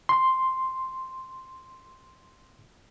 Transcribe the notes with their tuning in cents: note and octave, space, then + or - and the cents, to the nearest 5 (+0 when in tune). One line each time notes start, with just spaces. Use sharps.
C6 +0